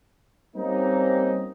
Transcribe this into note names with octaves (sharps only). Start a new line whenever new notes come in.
G3 A#3 C4 C#4 D#4